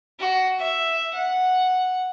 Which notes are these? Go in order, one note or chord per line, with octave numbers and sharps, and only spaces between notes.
F#4
E5
F#5